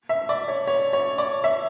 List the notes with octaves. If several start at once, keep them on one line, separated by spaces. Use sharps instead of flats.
E5
D5
C#5
C#5
C#5
D5
E5